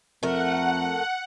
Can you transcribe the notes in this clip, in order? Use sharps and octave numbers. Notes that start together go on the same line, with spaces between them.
F2 A3 A#4 F#5